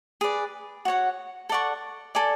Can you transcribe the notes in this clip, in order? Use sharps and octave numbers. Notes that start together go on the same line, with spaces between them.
G#4 B4 D5
F#4 C#5 F#5
A4 D5 F#5 C#6
A4 D5 G#5